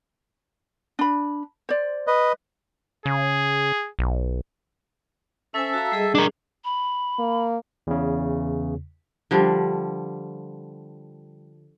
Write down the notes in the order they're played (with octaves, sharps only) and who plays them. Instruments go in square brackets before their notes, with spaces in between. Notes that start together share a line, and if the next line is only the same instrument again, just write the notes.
[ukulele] D4 B5
C5 D5
[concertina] B4 D#5
[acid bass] C#3 [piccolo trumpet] G#4
[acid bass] B1
[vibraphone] C#4 C5 G#5 [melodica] A4 E5 A5
[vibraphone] F#4 F5 A#5
G3 G#4 D#5
[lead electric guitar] D4 A#4
[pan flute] B5
[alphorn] A#3
[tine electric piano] E2 C#3
[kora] D3 F3 G3